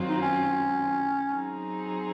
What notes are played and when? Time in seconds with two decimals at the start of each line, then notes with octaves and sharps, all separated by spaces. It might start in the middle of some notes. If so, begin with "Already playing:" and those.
Already playing: F#2 D#3 F#3 C4 F4
0.09 D#4
0.22 C#4
1.33 F#3 C4 D#4 G#4